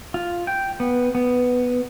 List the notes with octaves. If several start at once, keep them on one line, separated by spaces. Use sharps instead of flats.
F4
G5
B3
B3